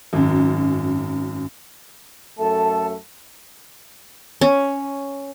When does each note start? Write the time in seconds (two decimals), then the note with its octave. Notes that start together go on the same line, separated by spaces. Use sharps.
0.13 G#1 F#2
2.38 F#2 A3 A4 A5
4.41 C#4